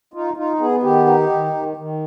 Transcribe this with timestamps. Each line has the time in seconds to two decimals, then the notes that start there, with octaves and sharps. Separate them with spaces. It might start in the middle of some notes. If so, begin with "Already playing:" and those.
0.14 D#4 F4
0.36 D#4 F4
0.60 B3 G#4
0.83 D#3 G4
1.06 D#4
1.30 D#3
1.53 D#3
1.77 D#3